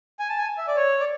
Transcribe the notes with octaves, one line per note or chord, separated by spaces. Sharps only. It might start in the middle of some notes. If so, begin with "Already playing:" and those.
G#5
A5
G#5
E5
D5
C#5
D5